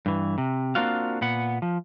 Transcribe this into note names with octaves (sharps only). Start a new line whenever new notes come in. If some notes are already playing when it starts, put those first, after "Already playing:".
G2 E3
C3
A#3 C4 D4 F4 F#4 F5
A#2 B3 F#5
F3